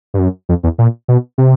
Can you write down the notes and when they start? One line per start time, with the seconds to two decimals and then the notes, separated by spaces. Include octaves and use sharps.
0.14 G2
0.19 F#2
0.49 F2
0.63 E2
0.78 A#2
1.08 B2
1.38 C3